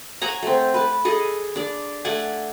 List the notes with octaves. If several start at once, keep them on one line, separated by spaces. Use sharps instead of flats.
C#5 F#5 G#5 A#5
A3 C4
B4 A5
G#4 A4 D#5
D4 D5
A3 D5 F#5 G#5